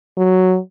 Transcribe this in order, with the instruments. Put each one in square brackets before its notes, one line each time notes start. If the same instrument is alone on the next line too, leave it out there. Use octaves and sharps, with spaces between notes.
[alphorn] F#3